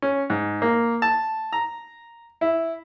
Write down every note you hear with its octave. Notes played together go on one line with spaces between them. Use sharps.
C#4
G#2
A#3
A5
A#5
E4